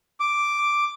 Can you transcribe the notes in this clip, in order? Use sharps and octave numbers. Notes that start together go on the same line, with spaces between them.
D6